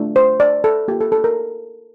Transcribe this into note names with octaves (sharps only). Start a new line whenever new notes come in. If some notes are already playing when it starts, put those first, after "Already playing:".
Already playing: A3 D4 F4
C5
D5
A4
A#3 F4 G4
A4
A4
A#4